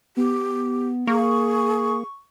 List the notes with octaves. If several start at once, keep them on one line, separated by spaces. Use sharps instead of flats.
B3 G4
A#3 G#4 C#6